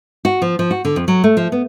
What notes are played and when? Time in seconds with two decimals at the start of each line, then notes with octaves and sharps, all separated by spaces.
0.25 F#4
0.42 F3
0.59 F3
0.71 F#4
0.85 D3
0.96 F2
1.08 F#3
1.24 A3
1.37 F3
1.52 B3